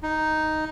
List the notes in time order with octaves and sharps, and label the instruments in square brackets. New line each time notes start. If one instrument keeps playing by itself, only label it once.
[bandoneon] D#4